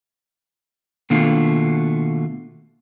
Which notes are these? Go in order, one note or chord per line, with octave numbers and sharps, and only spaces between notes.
B2 D#3 A3 A#3 D4 F4